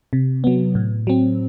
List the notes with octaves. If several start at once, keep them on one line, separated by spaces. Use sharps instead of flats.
C3
F#3 B3
A2
F#3 C4